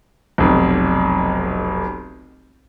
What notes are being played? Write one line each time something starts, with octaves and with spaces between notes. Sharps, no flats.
F1 B1